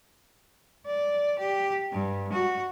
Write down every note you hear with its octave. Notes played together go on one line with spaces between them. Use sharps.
D5
G4
G2
F#4